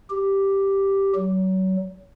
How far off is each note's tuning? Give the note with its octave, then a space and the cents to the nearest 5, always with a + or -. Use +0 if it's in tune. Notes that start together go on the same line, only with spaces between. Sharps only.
G4 +0
F#3 +30